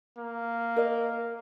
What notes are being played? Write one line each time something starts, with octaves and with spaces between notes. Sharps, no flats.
A#3
A#4 D#5